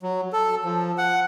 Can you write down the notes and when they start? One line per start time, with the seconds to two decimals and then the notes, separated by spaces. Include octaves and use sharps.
0.03 F#3
0.33 A4
0.64 F3
0.98 F#5